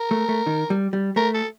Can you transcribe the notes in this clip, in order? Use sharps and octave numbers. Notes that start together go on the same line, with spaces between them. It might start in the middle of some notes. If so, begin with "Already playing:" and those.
Already playing: A#4
A3
A3
D#3
G3
G3
A3 A#4
A4